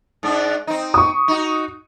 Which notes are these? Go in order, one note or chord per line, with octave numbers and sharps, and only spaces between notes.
G#2 D4
C4 D#4
C#6 D#6
D#4 F#4